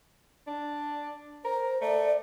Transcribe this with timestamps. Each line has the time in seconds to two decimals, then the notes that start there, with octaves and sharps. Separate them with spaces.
0.47 D4
1.45 A#4 C5
1.81 A3 D5